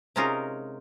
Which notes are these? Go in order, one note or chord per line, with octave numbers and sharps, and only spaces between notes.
C3 G#3 C#4 D#4 F4 A#4